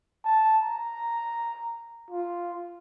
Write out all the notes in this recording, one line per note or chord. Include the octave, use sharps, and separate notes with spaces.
A5
A#5
F4